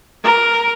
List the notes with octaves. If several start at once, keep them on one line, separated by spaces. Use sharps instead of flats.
A#4